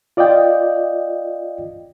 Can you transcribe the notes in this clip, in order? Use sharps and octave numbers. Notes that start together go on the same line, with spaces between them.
F4 D5 D#5 F5 G5